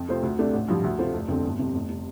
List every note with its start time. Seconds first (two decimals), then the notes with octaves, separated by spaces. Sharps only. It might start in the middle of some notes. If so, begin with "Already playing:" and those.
Already playing: F2
0.09 C3 A3 F4 C5
0.23 D2
0.39 C3 A3 D4
0.53 A1
0.68 G2 F3
0.84 D2
0.99 C3 A3 F4 C5
1.14 F1
1.28 F2 D3 A3 C4
1.44 G1
1.59 F2 C3
1.74 F1
1.90 C3